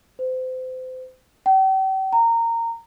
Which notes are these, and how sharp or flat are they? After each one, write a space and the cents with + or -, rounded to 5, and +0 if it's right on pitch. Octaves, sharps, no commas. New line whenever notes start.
C5 -30
G5 -40
A#5 -20